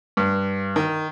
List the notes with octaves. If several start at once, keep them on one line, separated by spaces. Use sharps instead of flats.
G2
D#3